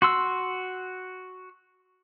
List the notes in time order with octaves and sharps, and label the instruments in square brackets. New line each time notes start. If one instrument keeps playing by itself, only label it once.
[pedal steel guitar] F#4 C6 E6